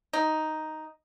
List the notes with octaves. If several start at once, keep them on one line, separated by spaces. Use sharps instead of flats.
D#4